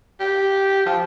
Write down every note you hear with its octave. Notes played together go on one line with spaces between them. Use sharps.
G4
F3